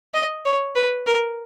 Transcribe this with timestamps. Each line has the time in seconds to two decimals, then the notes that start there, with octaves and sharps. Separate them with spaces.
0.14 D#5
0.45 C#5
0.75 B4
1.07 A#4